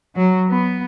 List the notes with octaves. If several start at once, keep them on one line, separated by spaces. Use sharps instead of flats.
F#3
B3